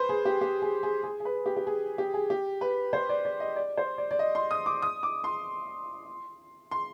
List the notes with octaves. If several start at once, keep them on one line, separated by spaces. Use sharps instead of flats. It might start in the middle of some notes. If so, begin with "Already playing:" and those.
Already playing: B4 C5
G#4
G4
G4
G#4
G#4
G#4
G#4
B4
G4
G4
G#4
G4
G#4
G4
B4
C5
D5
D5
D#5
D5
C5
D5
D5
D#5
C6
D#6
D6
D#6
D6
C6
C6